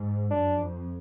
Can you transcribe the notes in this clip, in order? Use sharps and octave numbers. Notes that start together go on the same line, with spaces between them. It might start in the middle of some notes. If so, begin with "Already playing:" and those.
Already playing: G#2
F#2 D4
F2